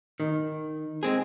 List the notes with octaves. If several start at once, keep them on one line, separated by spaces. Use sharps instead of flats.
D#3
G#3 C4 G#4